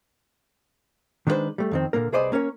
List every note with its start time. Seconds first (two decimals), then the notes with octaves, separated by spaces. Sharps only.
1.27 D#3 G#3 D4 D#4 B4 C5
1.58 G3 A3
1.71 F2 D#3 C4
1.93 A#2 D3 A#3 A#4
2.12 C2 G#4 B4 C5 D5 D#5
2.32 A#3 C#4 A#4 C#5